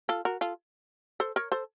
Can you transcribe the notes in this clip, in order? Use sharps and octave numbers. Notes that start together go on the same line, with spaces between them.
F4 A4
F#4 A#4
F4 A4
A4 C5
A#4 C#5
A4 C5